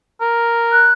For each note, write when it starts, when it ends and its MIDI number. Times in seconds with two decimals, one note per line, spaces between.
0.21 0.92 70
0.72 0.93 90